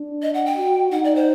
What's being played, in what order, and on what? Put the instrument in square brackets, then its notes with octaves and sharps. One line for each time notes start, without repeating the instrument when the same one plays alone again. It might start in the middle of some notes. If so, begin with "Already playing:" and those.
Already playing: [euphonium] D4
[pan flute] D#5
F#5
G5
[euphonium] F#4
[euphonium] D#4 [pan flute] F#5
[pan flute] D5
C5